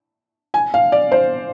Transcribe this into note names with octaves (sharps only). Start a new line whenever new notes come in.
G#5
F5
D5
C5